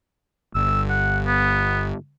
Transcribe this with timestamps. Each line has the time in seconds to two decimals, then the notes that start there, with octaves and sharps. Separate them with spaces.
0.55 G1 E6
0.89 F#5
1.27 B3